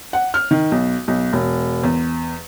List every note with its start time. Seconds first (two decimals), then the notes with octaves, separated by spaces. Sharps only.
0.13 F#5
0.34 F6
0.51 D#3
0.72 B1
1.08 B1
1.33 E1
1.84 E2